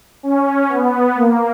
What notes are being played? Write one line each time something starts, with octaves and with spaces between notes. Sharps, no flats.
C#4
B3
A#3